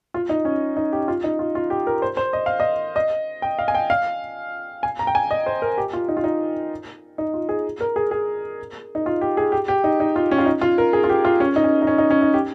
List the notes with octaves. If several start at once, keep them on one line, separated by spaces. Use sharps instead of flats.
F4
D#4
C#4
D#4
G4
F4
D#4
F4
F4
G4
A#4
C5
C5
D#5
F5
D#5
D#5
G5
F5
G#5
G5
F5
G#5
A#5
G5
G#5
D#5
C5
A#4
G4
F4
D#4
F4
D#4
D#4
F4
G#4
A#4
G#4
G#4
D#4
F4
G4
G#4
G4
G4
D#4
D#4
F4
C#4
F4
D#4
F4
A#4
G#4
F4
G4
F4
C#4
D#4
C#4
D#4
C#4
D#4
C#4
D#4
G4